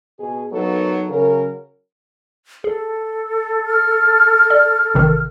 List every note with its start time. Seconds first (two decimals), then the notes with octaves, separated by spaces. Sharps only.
0.20 B2 G#4
0.52 F#3 A#3 B3 D#4 A4
1.10 C#3 F#3 A#4
2.64 G#4 A4
3.67 F6
4.50 D5
4.94 A1 C3 D#3